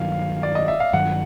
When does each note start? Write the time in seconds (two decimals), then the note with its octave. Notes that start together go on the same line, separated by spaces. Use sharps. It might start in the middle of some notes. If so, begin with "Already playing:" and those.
Already playing: G2 D#3 F#3 F5
0.43 D5
0.55 D#5
0.68 E5
0.80 F5
0.93 G2 D#3 F#3 F#5